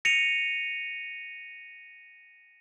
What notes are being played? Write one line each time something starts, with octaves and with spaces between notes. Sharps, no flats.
A#6 C#7 D#7 F7